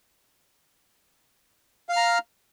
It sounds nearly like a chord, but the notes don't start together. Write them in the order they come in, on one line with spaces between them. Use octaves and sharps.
F5 F6 A#5